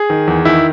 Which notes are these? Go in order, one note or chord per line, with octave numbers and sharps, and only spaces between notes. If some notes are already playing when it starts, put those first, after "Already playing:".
Already playing: G#4
D#3
E2
D#3 E4